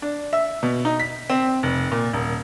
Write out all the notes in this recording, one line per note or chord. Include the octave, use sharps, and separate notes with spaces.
D4
E5
B2
D#4
B6
C4
F1
A#2
D#1